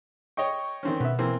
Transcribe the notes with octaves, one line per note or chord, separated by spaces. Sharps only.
C#5 D#5 G5 C#6
D#3 C4 C#4
B2 B3 E5
E3 A#3 C4